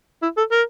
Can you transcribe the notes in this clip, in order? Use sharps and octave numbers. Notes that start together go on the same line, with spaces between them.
E4
A4
A#4